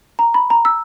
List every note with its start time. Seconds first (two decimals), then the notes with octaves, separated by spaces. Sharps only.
0.19 A#5
0.34 B5
0.50 A#5
0.65 E6